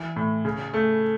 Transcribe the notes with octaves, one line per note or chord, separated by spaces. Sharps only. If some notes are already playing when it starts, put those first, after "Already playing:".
Already playing: E3
A2
C#3
A3